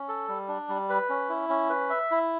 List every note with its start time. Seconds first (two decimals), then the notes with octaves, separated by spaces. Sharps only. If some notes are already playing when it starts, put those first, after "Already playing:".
Already playing: C#4
0.08 A4
0.28 G3
0.48 D4
0.69 G3
0.90 B4
1.10 C#4
1.29 E4
1.50 C#4
1.70 B4
1.90 E5
2.11 E4